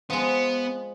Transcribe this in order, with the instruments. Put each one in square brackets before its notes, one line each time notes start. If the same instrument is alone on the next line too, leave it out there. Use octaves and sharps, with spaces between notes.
[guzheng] F3 G#3 [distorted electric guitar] B3